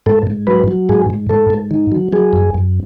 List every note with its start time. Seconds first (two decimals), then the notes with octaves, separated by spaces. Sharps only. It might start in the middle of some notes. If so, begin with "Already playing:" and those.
0.06 G#2 A4
0.27 G#2
0.47 F#3 B4
0.68 F#3
0.89 G#2 G#4
1.10 G#2
1.29 G#2 A4
1.50 G#2
1.71 D#3
1.92 F#3
2.12 F#3 G#4
2.33 F#2
2.54 F#2